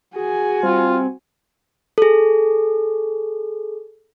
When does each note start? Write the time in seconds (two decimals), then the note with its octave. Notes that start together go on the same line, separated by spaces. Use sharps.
0.16 F#4 G#4 G#5
0.63 G3 C4 F4
1.98 G#4 A4